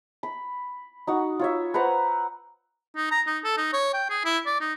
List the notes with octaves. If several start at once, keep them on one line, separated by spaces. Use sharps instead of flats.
B5
D#4 F#4 F#5
F4 C#5 E5
B4 C5 F#5 A#5
D#4
A#5
D#4
A4
D#4
C#5
G5
G#4
E4
D5
D#4